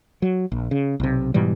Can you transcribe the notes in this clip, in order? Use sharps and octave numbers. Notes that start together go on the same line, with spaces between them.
F#3
A#1
C#3
B1 C3
G#2 B2 E3 G3